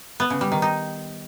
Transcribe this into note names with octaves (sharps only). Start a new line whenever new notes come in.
B3
C#3
G3
D#3
D#4